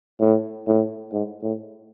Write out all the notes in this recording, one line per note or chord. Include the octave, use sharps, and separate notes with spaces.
A2
A2
G#2
A2